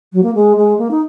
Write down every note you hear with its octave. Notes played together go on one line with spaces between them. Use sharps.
F#3
A#3
G#3
G#3
A#3
D#4